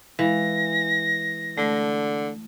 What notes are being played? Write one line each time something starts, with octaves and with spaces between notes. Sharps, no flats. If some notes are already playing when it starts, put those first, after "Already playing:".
E3 G#3 F5 A#6
D3 A3